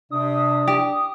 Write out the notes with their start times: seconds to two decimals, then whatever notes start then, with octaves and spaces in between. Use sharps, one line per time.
0.11 C3 D4 D#6
0.68 G4